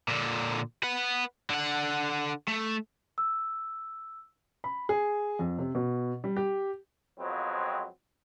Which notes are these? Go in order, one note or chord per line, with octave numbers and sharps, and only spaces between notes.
A#2 D3
B4 F#5
D3 F#5
A3
E6
B5
G#4
F2
C3
B2
G3
G4
F2 F3 F#3 G#3 B3 C4